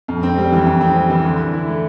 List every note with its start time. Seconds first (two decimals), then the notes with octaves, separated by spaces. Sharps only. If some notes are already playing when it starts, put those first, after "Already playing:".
0.08 F2
0.23 C4
0.37 G3
0.52 E3
0.66 F2
0.81 C4
0.96 G3
1.10 E3
1.25 D3
1.39 D3
1.53 E4
1.68 A3